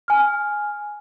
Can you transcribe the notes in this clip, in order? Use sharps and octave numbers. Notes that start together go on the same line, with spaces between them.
G#5 F6